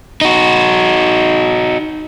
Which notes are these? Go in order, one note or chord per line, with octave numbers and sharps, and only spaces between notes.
D#4 F#4